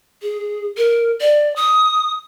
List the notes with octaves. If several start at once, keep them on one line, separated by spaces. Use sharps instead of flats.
G#4
A#4
D5
D#6